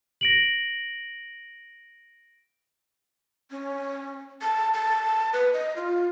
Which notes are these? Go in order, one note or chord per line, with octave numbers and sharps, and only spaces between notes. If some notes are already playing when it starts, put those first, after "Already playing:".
A#6 D7 F#7
C#4
A5
A5
B4
D#5
F4